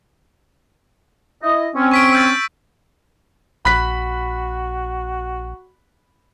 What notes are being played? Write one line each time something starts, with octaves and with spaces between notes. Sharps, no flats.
E4 D#5
C4 C#4
C#6 B6 D7
E6 G6 A6
A#1 F#4 B5 F#6 B6